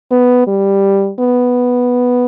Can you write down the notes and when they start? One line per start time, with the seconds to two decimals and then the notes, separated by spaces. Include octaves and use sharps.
0.11 B3
0.47 G3
1.19 B3